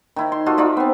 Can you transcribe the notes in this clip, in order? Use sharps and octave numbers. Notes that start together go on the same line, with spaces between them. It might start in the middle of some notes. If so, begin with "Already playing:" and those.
D#3 E4
C6
F4 F#4 A4 D#5
D#4 F4 D5 E5
B3 C4